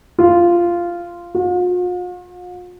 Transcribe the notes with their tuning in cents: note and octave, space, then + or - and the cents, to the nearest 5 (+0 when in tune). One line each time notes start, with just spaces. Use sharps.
F4 -10
F4 +45